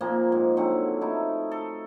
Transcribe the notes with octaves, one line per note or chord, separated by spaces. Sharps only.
A#2 F3 A#3 C4
G#2
D3 F#3 C4 F#5
A3 D#4 E4
A4